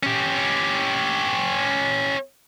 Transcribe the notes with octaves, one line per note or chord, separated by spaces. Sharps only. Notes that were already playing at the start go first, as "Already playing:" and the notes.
C#4 G4